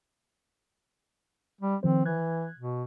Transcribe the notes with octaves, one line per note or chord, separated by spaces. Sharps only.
G3
D#3 F3 C4 C5
E3 F#6 G#6
B2